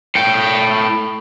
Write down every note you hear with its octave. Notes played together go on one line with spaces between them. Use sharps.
A2 G5